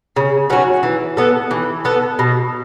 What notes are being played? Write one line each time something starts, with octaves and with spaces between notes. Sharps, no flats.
C#3
F#3 C#4 F#4
E3
B3 A4
E3
B3 A4
B2